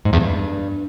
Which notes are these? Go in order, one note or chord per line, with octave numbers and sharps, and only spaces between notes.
G#2
E2
G2